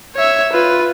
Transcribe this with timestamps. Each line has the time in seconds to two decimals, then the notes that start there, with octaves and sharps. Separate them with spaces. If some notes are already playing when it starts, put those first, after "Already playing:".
0.16 C#5 E5
0.53 F4 B4